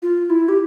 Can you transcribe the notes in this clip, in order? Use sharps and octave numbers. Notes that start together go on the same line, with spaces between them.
F4
E4
G4